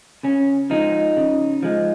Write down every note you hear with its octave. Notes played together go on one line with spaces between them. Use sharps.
C#3 C#4
F3 G#3 D#4
C#3
F3 G#3